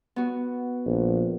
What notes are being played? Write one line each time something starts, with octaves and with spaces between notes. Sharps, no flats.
B3 F#4
A#1